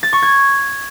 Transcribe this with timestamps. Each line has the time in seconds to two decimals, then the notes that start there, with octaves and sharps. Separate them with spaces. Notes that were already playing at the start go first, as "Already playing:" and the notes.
0.03 A6
0.13 C#6
0.23 G#6